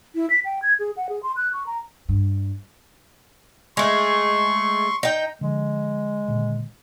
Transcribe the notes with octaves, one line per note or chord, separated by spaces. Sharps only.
E4
B6
G5
G#6
G#4
F#5
G#4
C6
F#6
C#6
A#5
G2
G#3 A3 C6 C#6
D#4 G5
D3 F3 G#3
A#2 D3 D#3